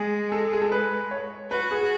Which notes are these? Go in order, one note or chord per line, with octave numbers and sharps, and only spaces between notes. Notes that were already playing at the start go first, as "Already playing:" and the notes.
Already playing: G#3 G#4
A4
G#4
A4
B4
C#5
F#4 B4
G#4
G#4